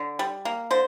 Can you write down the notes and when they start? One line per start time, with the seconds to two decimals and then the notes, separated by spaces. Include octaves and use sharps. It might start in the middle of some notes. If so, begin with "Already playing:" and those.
Already playing: D3
0.19 G3
0.45 A#3
0.71 D3 C5